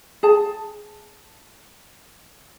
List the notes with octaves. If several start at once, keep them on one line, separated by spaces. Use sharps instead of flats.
G#4 A5